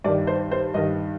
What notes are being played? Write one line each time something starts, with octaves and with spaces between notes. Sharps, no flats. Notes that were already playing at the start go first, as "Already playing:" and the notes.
G2 D#3 D5
C5
C5
G2 D#3 D#5